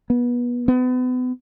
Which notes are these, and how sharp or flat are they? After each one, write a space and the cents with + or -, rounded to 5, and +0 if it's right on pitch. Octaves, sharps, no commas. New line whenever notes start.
B3 -25
B3 +35